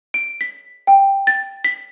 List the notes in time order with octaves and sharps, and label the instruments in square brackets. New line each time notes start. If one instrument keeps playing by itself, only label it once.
[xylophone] D7
B6
G5
A6
B6